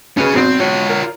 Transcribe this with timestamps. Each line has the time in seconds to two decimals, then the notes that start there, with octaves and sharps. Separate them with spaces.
0.17 B1 C#4 G#4 B4 F6
0.35 G#1 B2 F#3 C4
0.60 F4 C#5
0.89 A#4